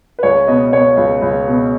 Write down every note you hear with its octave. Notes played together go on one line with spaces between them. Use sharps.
B4
C#2 C#5
B2 D#5
B2 C#5
C#2
C#2
B2